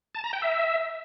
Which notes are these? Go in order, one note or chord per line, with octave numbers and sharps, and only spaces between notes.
A5
A#5
G5
E5